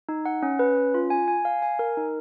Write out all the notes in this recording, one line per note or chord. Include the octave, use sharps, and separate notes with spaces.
D#4
F#5
C#4
B4
C#4
F4
G#5
G#5
F5
G#5
A#4
D#4